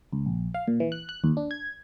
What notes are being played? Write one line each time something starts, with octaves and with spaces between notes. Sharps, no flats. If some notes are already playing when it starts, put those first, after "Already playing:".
C#2
A#1
F5
A#2
E3
F#6
F#6
D#2
D4
G#6